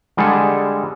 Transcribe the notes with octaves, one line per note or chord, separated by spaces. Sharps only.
D3 G3 G#3 G#4 A4